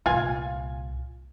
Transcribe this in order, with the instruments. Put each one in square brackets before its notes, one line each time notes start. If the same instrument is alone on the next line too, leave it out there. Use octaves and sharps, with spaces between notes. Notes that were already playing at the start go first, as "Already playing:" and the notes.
[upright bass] C2 A#2 [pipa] F4 F5 G#5